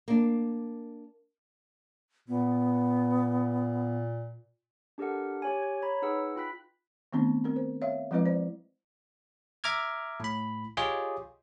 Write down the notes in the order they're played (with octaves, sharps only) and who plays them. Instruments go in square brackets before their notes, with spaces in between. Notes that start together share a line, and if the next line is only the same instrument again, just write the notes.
[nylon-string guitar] A#3 D4
[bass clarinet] A#2 [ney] B3
[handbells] D4 G4 A4 A#4 F#5
G4 C#5 G#5
G#6
C#5 A#5 B5
D#4 G#4 B4 F#5 E6
F4 G5 B5 F#6 B6
[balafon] D#3 A3 B3 C4 D4
C4 A#4
C5
C#5 E5 F5
F3 G#3 C4 E4 B4 D#5
C5 D5
[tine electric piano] E5 A#5 D6 F6 G#6
A2 B5
F4 G4 G#4 C#5 D#5 G5